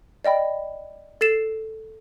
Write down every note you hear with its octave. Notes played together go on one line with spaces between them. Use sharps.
D5 D#5 G5 B5
A4 A6 C7 E7